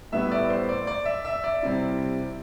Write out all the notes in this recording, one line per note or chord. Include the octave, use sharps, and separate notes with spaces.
A2 G3 B3 E4 E5
D5
C5
D5
D5
E5
E5
D5
C3 G3 C4 E4